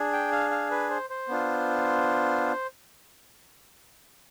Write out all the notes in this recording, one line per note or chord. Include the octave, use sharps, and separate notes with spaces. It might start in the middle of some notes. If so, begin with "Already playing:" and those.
Already playing: D4 G#4
G5
F5
F5
B4
C5
C5
B3 D4 F4